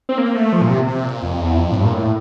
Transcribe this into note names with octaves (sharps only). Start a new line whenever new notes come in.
C4
A#3
A3
F3
A#2
C3
C3
A#2
F2
E2
F2
A2
G2
A#2
A2